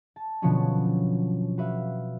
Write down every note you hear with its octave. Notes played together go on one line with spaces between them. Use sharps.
A5
B2 D3 F3 F#3 B3 C#4
F#4 B4 E5 F5